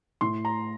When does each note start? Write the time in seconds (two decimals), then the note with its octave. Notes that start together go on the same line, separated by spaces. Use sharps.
0.21 A2 C6
0.45 A#5